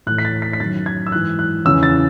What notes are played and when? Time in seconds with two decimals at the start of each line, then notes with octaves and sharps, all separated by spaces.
0.06 A2 E3 F#6
0.18 B6
0.25 A6
0.42 B6
0.53 B6
0.60 F#2 D#3 F#3 A6
0.86 G#6
1.07 E6
1.12 G#2 E3 F#6
1.39 F#6
1.65 E2 C#3 E3 E6
1.83 A6